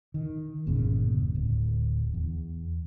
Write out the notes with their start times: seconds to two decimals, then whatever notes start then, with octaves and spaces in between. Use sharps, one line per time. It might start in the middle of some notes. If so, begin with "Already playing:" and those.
0.14 D#3
0.66 G1 E2 A#2 C#3
1.35 D1
2.14 E2